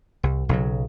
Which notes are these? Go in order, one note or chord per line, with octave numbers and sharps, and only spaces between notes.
C2
B1 C#3 F#3